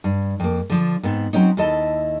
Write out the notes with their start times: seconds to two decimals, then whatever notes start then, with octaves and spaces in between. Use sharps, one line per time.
0.04 G2
0.40 F2 A#3
0.70 D3 F3
1.03 G#2 B3 C4
1.33 F#3 C4 C#4 D#4
1.57 D#2 E4 A4 D#5 A5